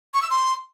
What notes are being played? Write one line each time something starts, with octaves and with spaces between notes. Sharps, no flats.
C#6
E6
C6